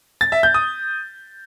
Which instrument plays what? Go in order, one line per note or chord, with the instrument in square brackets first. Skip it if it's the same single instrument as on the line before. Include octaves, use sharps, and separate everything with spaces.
[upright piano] A6
E5
G6
D#6